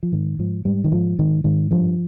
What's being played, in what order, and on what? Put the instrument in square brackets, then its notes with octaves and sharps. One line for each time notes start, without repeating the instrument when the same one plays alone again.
[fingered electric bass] F3
G#2 D#3
G#2 F3
G#2 G3
D#3
G#2 F3
G#2 D#3
G#2 D#3
G2 F3